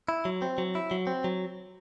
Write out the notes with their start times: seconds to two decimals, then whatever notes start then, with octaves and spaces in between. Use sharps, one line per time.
0.09 E4
0.25 F#3
0.42 C4
0.58 F#3
0.75 E4
0.91 F#3
1.07 C4
1.24 F#3